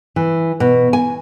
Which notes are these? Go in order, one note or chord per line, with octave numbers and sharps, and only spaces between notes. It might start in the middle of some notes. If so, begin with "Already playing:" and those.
E3
B2
G#5